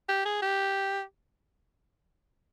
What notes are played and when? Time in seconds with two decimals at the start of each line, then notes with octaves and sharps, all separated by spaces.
0.09 G4
0.25 G#4
0.42 G4